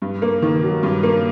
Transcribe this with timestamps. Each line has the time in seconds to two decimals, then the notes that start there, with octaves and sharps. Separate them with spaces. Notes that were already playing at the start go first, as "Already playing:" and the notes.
0.02 G2
0.22 A#3
0.42 D#3
0.63 F#3
0.83 G2
1.03 A#3